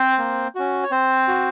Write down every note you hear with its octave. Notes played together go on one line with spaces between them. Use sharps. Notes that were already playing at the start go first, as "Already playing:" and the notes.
Already playing: C4 C5
A#3
C#4 F#4
C#5
C4 C5
F#4